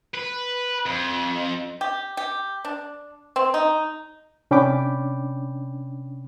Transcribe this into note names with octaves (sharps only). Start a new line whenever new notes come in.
B4
F2
G4
G4
D4
C4
D#4
C3 C#4 D4 G5 B5 D6